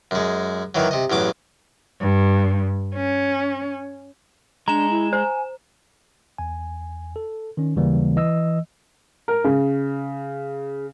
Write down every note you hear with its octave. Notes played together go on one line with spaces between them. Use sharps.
F#2 G#3
D#3 E3 F#3
C3 D#5
A1 E2 F#3 D6
G2
C#4
G#3 D4 A#5 E7
E4
C5 G#5
E2 G#5
A4
D#3 C#4
D#2 C#3 E3 G3 A#3
E3 D#5 E6
A#4
C#3